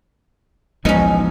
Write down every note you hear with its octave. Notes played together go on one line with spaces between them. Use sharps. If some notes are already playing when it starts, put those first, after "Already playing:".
A1 D2 B2 F3 G#3 B3 C#4 D#4